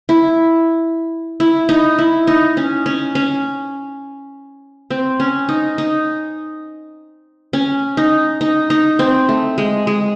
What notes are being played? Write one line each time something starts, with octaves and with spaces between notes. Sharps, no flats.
E4
E4
D#4
E4
D#4
C#4
C#4
C#4
C4
C#4
D#4
D#4
C#4
D#4
D#4
D#4
C4
A3
G#3
G#3